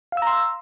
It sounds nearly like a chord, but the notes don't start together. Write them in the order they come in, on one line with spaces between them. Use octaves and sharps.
F5 E6 A#5 C6